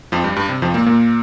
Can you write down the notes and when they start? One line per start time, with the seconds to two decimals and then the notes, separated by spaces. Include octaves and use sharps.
0.12 F2 F3
0.24 G2 G3
0.36 G2 G3
0.49 C3
0.62 F2 F3
0.74 A#2 A#3
0.86 A#2 A#3